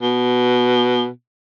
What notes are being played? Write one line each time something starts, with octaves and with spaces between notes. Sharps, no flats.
B2